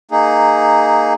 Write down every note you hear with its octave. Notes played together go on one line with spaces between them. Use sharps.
A#3 D#4 G#4